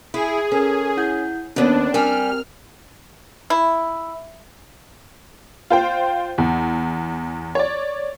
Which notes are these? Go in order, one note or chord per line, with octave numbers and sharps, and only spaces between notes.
E4 G#4
C#4 A4 A#4
E4 F#5 G6
D#2 B3 C#4 D4
G3 C4 A#4 G5 G#5 F6
E4
F4 C5 G5
E2
C#5 D5